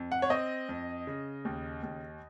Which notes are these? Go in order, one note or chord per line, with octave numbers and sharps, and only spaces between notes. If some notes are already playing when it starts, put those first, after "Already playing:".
Already playing: F2
F#5
C#5
C4 D#5
F2
C#3
D#2
D#2